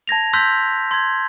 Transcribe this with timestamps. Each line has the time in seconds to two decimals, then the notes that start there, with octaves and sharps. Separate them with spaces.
0.08 A5 G#6 A#6 F7
0.33 C6 E6 F#6 G6 B6
0.91 C6 G#6